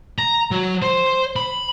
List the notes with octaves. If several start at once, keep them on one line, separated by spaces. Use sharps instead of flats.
A#5
F#3
C5
B5